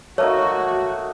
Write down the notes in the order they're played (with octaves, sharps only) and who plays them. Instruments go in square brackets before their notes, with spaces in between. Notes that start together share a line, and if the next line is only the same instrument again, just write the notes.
[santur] A3 A#3 D#4 [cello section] F#4 [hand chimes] C#5